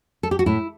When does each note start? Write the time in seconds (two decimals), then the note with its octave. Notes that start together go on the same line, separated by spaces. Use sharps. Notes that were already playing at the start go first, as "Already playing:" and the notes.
0.23 A4
0.31 G4
0.39 F#4
0.46 A2 E4